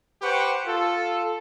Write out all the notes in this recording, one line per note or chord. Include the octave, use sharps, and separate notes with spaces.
G4 B4 C5 F#5 G5 C#6
F4 A4